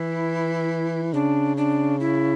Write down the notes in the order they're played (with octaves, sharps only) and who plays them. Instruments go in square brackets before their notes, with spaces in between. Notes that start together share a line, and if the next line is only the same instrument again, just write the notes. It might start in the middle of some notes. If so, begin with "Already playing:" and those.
Already playing: [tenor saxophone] E3 [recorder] E4
[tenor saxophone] C#3 [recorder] D4
[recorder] D4
E4